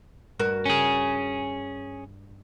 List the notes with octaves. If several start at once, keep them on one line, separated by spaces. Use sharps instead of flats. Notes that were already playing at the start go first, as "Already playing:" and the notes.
G2 F#4 A#4
C#4 G#4